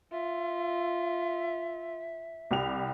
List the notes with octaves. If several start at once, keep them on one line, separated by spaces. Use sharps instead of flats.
F4 E5
C2 G4 F7